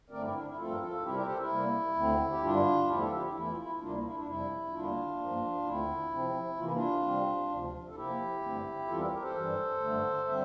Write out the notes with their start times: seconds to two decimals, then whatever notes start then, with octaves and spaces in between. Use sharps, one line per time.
0.10 G2 D3 A3 C4 A#4 D5
0.22 E4
0.33 D4
0.45 E4
0.56 G2 F3 A3 C4 F4 A4
0.71 A#4
0.80 F4 A4
0.98 F4
1.03 C3 G3 C4 E4 G4
1.14 G4 A#4
1.26 A4 C5
1.37 E4
1.49 C3 G3 A#3
1.95 D2 D3 A3 C4
2.30 G4
2.41 G2 D3 G3 D4 F4
2.87 E2 D3 F3 A3 E4 G4
2.99 F4 A4
3.10 E4 G4
3.22 E4
3.33 E2 E3 A3 E4
3.48 F4
3.57 E4
3.75 E4
3.80 D2 C3 G3 A#3 D4 F4
3.91 E4
4.03 E4
4.15 D4
4.26 F2 C3 G3 E4
4.72 E2 D3 G3 A#3 D4 F4
5.18 G2 F3 A#3
5.64 D2 D3 A3 C4 E4
6.11 C3 F3 C4
6.57 C3 E3 A#3 F4
6.65 E4
6.73 D4 F4
7.03 C3 G3 C4
7.49 D2 C3 F3
7.89 A4
7.95 C3 F3 A#3 E4 G4
8.42 G2 D3 A3 C4
8.88 E2 E3 G3 C4 F4 A4
8.99 G4 A#4
9.11 G4 A#4
9.22 A4 C5
9.34 G2 E3 G3
9.80 G2 D3 A3
10.26 D3 G3 C4 C5 E5